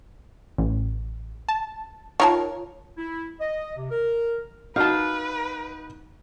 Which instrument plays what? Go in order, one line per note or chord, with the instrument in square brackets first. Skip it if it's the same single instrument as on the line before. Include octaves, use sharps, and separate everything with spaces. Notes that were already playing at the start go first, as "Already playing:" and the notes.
[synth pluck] A1
A5
[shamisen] D#3 A#4 A5 [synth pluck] F4 C#5
[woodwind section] E4
D#5
C3
A#4
[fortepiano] D#4 F#4 [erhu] B4 [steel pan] F5 A5